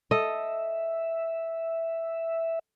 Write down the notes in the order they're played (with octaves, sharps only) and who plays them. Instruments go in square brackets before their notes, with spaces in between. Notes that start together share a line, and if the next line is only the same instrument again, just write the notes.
[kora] A4 D#5 [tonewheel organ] E5